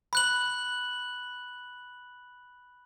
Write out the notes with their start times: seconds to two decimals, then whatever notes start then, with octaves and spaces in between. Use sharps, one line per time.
0.13 B5 F#6 F#7